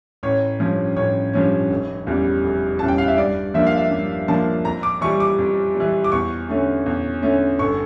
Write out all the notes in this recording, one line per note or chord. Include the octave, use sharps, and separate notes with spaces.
A1 C#5
G2 F3 C#4
A1 C#5
G2 F3 C#4
F1
E2 C#3 G3
F1
E2 C#3 G3 A5
G5
F5
E5
G2 D5
F3 A#3 D4 E5
F5
E5
G2
F3 A#3 D4 A5
F2 A#5
D6
E3 G3 C#6
D6
F2
G3
E3
D6
E2 C#6
D3 A3 C#4
E2
D3 A3 C#4
G1 C#6